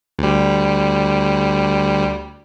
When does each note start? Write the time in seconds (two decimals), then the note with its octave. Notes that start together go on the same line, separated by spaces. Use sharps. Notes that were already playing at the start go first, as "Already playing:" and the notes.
0.19 D2 G3